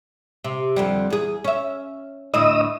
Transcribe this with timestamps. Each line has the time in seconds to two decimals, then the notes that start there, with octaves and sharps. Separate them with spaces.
0.44 C3
0.76 F2 D3 G3
1.10 E2 G#4
1.44 C#4 E5
2.34 D2 A2 E4 D#5 D#6 E6